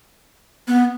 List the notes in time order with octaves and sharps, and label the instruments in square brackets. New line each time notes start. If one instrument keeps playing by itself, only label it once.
[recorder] B3